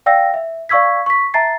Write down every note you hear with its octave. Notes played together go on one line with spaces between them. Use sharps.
D5 F5 G5 E6 A#6
E5
D5 F5 C#6 E6 G#6 B6
C#6 B6
E5 A5 A#5 A6 C7